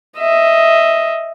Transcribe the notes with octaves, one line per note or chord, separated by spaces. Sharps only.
D#5 E5